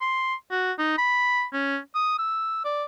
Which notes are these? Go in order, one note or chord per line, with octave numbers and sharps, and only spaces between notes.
C6
F#4
D#4
B5
C#4
D#6
E6
D5